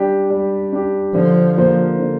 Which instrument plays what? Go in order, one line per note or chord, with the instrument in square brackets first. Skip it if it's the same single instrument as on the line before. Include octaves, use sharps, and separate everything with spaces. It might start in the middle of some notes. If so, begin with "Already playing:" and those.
Already playing: [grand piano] G3 D4 G4
G3
D4 G4
[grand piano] D3 [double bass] F3
[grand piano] A#3 F4 C5
D3